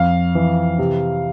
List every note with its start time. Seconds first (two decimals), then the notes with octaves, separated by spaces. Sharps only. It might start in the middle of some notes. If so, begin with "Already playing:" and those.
Already playing: F2 F5
0.35 E3
0.78 C3